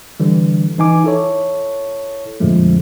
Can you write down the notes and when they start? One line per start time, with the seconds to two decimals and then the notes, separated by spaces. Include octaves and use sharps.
0.20 D3 E3 G3
0.78 E3 D#4 G#5 D6
1.04 E4 A4 C#5
2.40 F2 A#2 D3 F3 G#3 A3